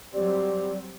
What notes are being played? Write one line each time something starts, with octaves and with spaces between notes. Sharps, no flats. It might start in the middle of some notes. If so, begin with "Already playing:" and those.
F#3 G3 C4 G4 D5